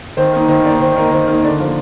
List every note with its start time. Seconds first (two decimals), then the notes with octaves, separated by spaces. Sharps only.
0.17 D#3 C5
0.33 A#3 D#4
0.48 D#3 C5
0.64 A#3 D#4 D5
0.80 D#3 C5
0.96 A#3 D#4 A#4
1.11 D#3 C5
1.27 A#3 D#4
1.43 D3 D5
1.59 F3 A#3 F4